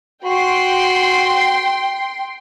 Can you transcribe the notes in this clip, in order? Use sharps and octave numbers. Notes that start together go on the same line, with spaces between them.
F#4 G5 C6